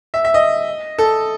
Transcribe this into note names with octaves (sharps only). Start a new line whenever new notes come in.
E5
E5
D#5
A4